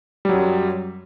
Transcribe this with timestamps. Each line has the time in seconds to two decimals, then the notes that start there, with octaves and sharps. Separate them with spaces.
0.25 G3
0.29 F#3
0.33 F#2